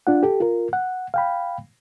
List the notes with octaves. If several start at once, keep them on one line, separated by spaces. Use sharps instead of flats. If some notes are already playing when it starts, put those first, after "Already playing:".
D4 F4 F#5
G4 A4
F4 A#4
F#5
F5 G5 B5